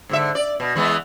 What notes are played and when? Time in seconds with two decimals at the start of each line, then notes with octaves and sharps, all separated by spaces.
0.09 G#2 D3 E5
0.35 D5
0.60 B2
0.75 E3 G#3 B3